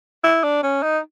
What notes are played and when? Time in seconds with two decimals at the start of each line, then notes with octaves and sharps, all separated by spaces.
0.24 E4
0.44 D4
0.64 C#4
0.83 D#4